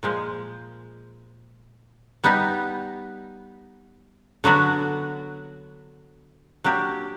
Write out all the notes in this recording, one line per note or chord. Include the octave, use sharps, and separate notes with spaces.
A#2 F3 G#3
G3 B3 D#4 G4
D3 F#3 B3 D4 F#4
F#3 A#3 D4 G4